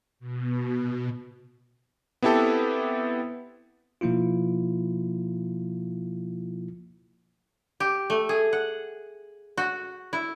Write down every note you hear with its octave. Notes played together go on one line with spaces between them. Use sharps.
B2
B3 C4 E4 G4 A4
B2 F3 A#3 E4 F4
G4
A3
G#4
F#5
F#4
E4